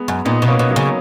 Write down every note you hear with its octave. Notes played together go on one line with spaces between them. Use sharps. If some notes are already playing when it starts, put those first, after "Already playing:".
Already playing: G#3 B3
F#2
A#2 B3 D#4
B2 D#4
A#3 C#4
B2
F#3 A#3
C#3